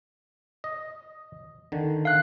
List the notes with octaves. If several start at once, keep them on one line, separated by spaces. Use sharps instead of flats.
D#5
D3 D#3
F5 F#6